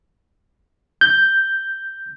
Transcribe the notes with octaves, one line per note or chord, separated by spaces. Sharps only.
G6